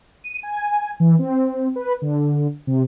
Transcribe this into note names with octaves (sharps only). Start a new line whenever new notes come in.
D#7
G#5
E3
C4
B4
D3
C3